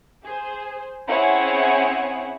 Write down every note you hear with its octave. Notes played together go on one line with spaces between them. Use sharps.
G#4 C5
C4 C#4 E4 G#4 C#5 F#5